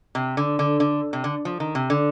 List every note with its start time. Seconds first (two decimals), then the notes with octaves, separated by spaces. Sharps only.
0.15 C3
0.37 D3
0.59 D3
0.80 D3
1.13 C3
1.24 D3
1.45 F3
1.60 D#3
1.75 C3
1.90 D3